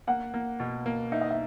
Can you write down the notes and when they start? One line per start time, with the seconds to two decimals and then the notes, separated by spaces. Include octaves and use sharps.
0.07 A#3 F#5
0.34 A#3
0.60 B2
0.86 A#3
1.12 D#4 E5
1.21 D#5
1.30 E5